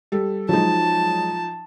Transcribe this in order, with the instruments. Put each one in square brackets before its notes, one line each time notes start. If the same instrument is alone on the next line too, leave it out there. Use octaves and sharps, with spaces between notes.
[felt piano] G3 A4
[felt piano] F3 D#4 [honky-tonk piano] F#3 G#3 [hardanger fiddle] A5